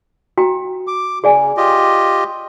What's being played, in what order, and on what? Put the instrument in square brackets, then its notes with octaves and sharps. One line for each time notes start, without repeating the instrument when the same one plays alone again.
[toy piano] F#4 G5 A#5
[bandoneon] D6
[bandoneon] C#3 [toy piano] G#4 D5 G#5
[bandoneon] F4 G4 D#5